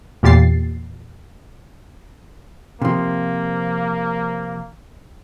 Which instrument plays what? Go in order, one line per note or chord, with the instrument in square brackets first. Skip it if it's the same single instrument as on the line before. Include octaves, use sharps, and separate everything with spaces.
[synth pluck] E2 A#2 G4 A6 C7
[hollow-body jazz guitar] C3 F3 [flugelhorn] A#3